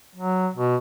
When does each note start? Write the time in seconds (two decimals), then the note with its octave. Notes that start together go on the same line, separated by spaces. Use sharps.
0.16 F#3
0.55 B2